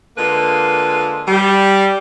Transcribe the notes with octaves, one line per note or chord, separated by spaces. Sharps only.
D3 G#3 A#3 F4 B4
G3